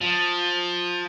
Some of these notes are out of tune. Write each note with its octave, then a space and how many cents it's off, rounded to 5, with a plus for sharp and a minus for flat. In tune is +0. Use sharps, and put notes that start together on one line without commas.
F3 +15